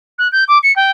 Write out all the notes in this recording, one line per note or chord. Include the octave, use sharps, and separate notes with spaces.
F#6
G6
D6
C#7
G5